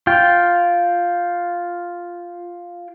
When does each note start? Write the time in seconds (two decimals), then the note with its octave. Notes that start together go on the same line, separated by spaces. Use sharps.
0.07 F4 G5